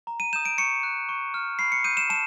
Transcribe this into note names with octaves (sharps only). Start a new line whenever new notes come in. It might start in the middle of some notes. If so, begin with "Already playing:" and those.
A#5
D#7
D#6 G6 E7
D7
C#6 C#7
F#6
C#6
F6
B5 C7
C#7
D#6 G6 D#7
E7
A5 E7